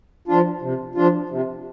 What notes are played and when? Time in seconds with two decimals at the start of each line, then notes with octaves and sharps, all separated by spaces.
0.28 F3 D4 F4
0.62 C3
0.95 F3 D4 F4
1.30 C3